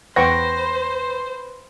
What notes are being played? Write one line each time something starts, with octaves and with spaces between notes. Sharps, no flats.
E2 B4 C5 F#5 G5 C#6 A#6